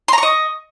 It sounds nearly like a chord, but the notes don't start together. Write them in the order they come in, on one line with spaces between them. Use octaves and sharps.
C6 A#5 C#6 D#5